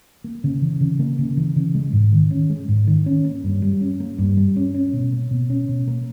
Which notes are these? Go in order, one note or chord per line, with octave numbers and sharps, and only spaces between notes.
A#3
C#3
E3
C#3
A#3
C#3
E3
C#3
G#3
G#2
D#3
C#4
G#3
G#2
D#3
C#4
A#3
G2
G3
C#4
A#3
G2
G3
C#4
C#4
B2
A#3
B2
C#4
B2
A#3